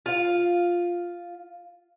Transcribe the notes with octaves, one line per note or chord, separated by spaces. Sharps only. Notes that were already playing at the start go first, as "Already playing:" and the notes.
F4 F5